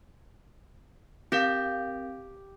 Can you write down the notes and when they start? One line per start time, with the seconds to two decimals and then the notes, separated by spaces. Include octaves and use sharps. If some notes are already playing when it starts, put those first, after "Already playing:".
1.32 C4 G4 A#4 F5